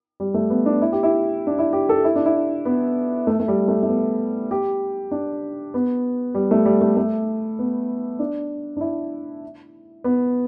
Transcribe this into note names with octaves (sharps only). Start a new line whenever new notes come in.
G3
A3
B3
D4
E4
G4
E4
D4
E4
G4
A4
E4
D4
E4
B3
A3
A3
G3
A3
A3
B3
G4
D4
B3
G3
A3
G3
A3
A3
B3
D4
D4
E4
B3